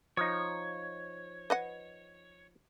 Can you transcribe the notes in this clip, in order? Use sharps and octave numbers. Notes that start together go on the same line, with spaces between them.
F3 D#4 C#5
B4 D#5 F#5